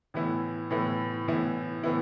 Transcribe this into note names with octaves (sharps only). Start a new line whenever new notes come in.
A2 E3 B3 E4
A2 E3 B3 E4
A2 E3 B3 E4
A2 E3 B3 E4